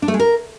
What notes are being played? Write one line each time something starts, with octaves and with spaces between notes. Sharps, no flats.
D4
A3
G#3
A#4